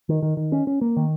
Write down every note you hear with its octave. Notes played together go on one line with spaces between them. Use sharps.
D#3
D#3
D#3
C#4
C#4
A#3
D#3